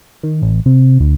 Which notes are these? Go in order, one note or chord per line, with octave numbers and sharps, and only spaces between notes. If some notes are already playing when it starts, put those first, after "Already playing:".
D#3
A1
C3
D2